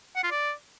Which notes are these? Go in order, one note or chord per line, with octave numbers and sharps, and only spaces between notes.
F#5
F4
D5